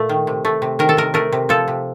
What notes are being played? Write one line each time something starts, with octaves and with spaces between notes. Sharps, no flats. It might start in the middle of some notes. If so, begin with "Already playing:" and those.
Already playing: A#2 A3
D#3
C3
A3
C3
D#3 A#4
A4
C3 A#4
A3 A#4
C3
F3 A4
C3